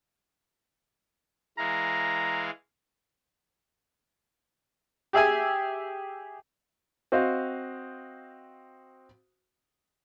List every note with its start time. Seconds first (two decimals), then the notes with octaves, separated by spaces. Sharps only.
1.58 E3 G#3 F5 A#5
5.13 G4 G#4 E5 G#5
7.12 C4 F#4 C5 D#5 F5